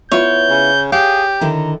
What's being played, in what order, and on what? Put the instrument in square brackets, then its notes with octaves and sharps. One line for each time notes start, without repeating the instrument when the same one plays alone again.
[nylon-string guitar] B3 E4 F4 [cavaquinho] C#5 [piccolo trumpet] G6
[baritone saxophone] C#3
[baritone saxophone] G4 [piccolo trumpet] G#4 [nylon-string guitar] F5
[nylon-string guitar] D3 D#3 E4 [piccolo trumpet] A#5